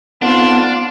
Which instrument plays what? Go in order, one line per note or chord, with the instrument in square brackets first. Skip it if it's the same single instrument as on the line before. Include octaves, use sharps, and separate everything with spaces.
[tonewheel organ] B3 F#5 [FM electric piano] C4 D#4 A4 [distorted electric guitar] D4 [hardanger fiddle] F4